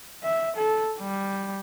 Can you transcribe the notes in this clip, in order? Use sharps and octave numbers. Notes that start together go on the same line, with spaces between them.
E5
A4
G3